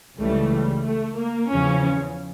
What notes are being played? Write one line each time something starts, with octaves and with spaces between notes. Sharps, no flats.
C#2 C#3 E3 G3 A3
G3
A3
A#3
E2 C#3 F3 C#4